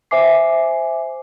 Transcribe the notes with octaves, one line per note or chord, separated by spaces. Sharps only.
C5 E5 G#5 D6 C7